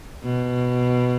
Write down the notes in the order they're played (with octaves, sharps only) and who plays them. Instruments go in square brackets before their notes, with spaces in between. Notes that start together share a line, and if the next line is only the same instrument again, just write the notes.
[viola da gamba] B2